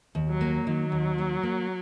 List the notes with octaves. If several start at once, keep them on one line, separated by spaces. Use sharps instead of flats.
D#2
F#3
A#3
D#3 F#3
D#2
A#3
A#3